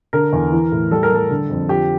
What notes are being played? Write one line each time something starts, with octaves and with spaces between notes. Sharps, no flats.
D3 A#4
E2
E3
A2
G3 A4
A#4
G3 A4
D3
F2
F3 G4